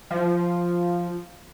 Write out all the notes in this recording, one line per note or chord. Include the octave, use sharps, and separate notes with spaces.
F3